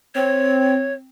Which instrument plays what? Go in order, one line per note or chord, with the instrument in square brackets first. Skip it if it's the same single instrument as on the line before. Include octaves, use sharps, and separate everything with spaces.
[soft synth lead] C4 [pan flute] C#5